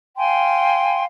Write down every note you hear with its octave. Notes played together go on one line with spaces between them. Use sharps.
F5 G5 G#5 C6